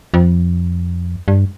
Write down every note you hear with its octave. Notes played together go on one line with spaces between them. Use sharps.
F2
G2